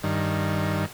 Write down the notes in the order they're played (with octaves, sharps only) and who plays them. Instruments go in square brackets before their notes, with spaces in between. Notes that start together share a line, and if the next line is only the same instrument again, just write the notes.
[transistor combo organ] G2 D#3